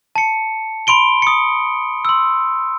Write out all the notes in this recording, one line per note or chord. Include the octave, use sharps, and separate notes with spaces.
A5 C#7
B5 C6 D7 G7
D#6 C#7
C6 E6